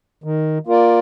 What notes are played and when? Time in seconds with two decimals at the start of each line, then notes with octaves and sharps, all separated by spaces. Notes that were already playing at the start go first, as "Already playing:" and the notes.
0.24 D#3
0.67 A#3 F4 A#4 D5